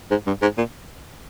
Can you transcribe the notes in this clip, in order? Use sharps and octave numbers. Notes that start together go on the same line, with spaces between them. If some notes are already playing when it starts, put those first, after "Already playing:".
G#2
G2
G#2
A#2